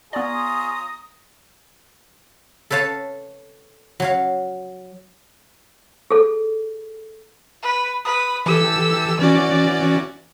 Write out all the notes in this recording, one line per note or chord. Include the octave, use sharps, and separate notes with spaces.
B3 F4 G#4 C#5 D5 A#5 D#6
A4 B4 C#5 F5 A5
F#3 C#5 F5
G#4 A4
B4
B4 D#6
E3 G4 A4 E6
E3 C#4 F#4 D5